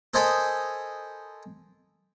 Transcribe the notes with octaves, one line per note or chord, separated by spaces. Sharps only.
A4 A#4 C5 D#5 G#5 B5